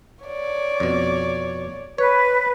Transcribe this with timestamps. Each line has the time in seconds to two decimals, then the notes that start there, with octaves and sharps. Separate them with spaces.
0.25 C#5 D5
0.80 F2 B2
1.98 B4 C#5